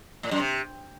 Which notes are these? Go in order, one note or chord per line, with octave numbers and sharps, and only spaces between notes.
A2
F#2
C3